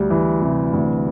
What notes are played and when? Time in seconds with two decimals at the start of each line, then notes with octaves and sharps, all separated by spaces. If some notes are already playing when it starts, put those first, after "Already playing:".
Already playing: D2 G3
0.10 E3
0.42 C3
0.73 D2